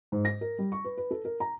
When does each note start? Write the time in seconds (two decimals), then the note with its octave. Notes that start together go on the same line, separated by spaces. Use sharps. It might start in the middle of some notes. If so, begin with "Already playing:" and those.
0.12 G#2
0.25 A#6
0.41 A#4
0.58 G3
0.72 C#6
0.84 B4
0.97 B4
1.11 A4
1.25 A#4
1.40 A#5